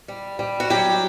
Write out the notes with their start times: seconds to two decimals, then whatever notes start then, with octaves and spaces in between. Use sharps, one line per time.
0.08 G3
0.39 G3
0.60 F#4
0.70 F#3 G4